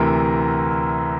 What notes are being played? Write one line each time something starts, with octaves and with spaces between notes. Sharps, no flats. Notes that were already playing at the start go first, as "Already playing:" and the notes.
Already playing: D2 C3 E3 A#4